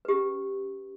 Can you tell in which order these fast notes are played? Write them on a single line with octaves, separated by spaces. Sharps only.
B4 G4 C#4